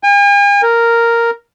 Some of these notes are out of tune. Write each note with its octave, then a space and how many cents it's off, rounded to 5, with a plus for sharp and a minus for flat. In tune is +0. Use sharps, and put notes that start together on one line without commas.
G#5 -45
A#4 -5